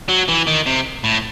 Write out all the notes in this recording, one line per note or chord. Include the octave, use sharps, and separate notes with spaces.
F#3
E3
D#3
C3
A2